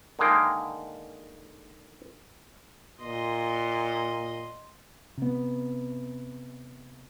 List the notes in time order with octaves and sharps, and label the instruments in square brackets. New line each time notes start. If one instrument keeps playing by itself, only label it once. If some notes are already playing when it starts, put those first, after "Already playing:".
[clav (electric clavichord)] D3 D#3 G#3 A#3 G5
[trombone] A#2 [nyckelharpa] D#5 C6
[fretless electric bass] C3 B3